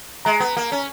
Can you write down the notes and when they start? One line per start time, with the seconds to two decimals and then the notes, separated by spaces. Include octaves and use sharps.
0.25 G#3 A#5
0.40 B3
0.57 A#3
0.72 C#4